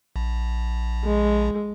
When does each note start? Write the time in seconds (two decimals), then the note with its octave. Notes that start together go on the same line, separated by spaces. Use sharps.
0.16 A#1
1.04 G#3